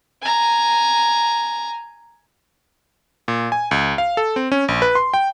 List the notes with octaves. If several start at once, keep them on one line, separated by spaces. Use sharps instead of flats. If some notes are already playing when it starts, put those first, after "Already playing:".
G#5 A#5
A#2
G#5
C#2
F5
A4
C4
C#4
A#1
B4
C6
G5